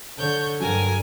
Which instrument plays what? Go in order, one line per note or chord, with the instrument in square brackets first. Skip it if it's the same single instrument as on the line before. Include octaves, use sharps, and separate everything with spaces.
[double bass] D3 [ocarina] A4 [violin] C#5 G6
[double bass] G2 [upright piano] F#3 [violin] A#4 G#5